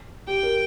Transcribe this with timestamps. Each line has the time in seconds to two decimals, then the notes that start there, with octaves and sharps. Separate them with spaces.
0.27 G4 G5
0.43 A#4